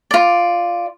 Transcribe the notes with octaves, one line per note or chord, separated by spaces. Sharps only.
F4 D5